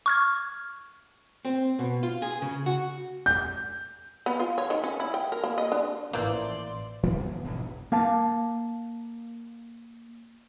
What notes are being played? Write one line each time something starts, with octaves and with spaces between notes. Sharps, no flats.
C#6 F6 G#6
C4
B2
F4
G#4
C#3
F#4
G6
B3
F4
C#5
D#3
C#4
E4
G5
A#4
A#3
D#5
D4
A1 E3 F3 A#3 D5 C6
E3 B3 D4
D1 G#1 F2 B2
A#3 F5 A5